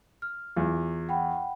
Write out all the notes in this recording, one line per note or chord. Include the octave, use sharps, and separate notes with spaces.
F6
E2 F4
F#5 G5 B5